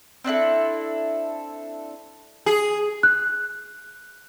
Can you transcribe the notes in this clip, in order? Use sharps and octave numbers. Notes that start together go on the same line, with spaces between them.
C4 D4 E4 A4
G#4
F#6